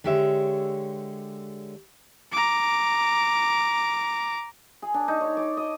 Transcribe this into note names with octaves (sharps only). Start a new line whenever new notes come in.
D3 G#3 G4 C#5 E5
A#5 D6
G#4
D4
D#4
C#5
D5
D#5